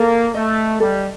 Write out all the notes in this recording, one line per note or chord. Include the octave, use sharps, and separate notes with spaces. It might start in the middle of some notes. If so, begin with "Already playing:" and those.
Already playing: A#3 A4
A3 D#5
G3 A4